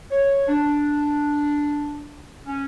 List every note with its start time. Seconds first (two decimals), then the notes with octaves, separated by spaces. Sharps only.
0.11 C#5
0.47 D4
2.46 C#4